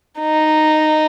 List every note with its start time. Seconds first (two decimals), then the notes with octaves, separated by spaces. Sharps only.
0.20 D#4